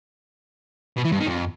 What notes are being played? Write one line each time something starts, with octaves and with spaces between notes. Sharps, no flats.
B2
E3
G2
D#3
F2